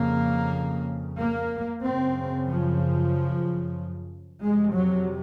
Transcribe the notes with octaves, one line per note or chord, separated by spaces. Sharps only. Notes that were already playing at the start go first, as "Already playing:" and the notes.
Already playing: F2 C#3 A#3
A#3
F#2 C#3 C4
F3
F2 C3 G#3
F#3